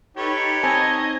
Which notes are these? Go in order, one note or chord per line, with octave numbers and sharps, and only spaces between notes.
D#4 G4 A4 B4 C#5
C4 D#5 G#5 A5 G#6